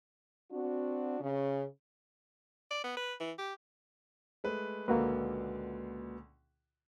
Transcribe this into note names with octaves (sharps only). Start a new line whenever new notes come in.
C4 D4 F#4
C#3
D5
B3
B4
E3
G4
G#3 A3 B4
C#2 A#2 D3 A#3 F#4 B4